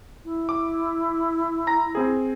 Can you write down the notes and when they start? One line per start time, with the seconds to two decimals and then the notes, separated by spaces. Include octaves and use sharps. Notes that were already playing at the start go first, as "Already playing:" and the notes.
0.25 E4
0.49 D6
1.67 A#5 A#6
1.95 C4 G#4